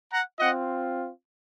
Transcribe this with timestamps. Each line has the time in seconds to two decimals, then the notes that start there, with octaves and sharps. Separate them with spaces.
0.11 F#5 A#5
0.39 C4 F4 D#5 F#5